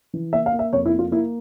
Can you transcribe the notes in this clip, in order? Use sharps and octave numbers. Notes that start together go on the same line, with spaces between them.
E3
A#3 E5
F5
A#3
E5
F2 C#5
E4
A#3
F4
A#3 E4